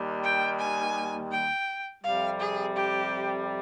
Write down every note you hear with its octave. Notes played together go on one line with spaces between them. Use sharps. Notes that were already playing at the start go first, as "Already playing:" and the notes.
Already playing: D#2 D#3 G3
G5
G#5
G5
F2 C3 G3 F5
G#4
G4